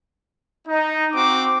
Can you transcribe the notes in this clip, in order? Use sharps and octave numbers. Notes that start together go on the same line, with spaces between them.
D#4
C4 F#4 D6